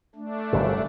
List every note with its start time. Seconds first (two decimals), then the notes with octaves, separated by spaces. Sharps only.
0.15 A3 D4
0.53 G1 F#2 C3